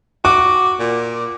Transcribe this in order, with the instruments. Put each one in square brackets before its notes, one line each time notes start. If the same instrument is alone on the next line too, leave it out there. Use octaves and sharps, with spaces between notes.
[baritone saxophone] F#4 [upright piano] D6
[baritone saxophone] A#2